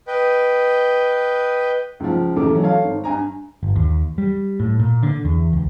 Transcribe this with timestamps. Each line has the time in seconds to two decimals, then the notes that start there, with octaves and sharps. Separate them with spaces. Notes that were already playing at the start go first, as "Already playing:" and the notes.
0.07 B4 D#5 G5
2.00 C#2 F3
2.36 D#1 E2 C#3 A3 D6
2.50 E3 F#3
2.62 A4 C#5 F5
2.85 G#1
3.04 G2 G#5 A#5
3.63 G1
3.76 D#2
4.18 G3
4.60 A2
4.79 A#2
5.03 D3
5.25 E2
5.53 C#2